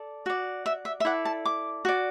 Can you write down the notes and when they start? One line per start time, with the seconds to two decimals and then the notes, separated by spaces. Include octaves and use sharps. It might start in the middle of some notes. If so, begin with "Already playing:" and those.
Already playing: A4 D5
0.26 F#4 D5
0.66 E5
0.85 E5
1.00 E5
1.05 E4 A4 D5 F#5
1.25 A5
1.45 D6
1.85 F#4 D5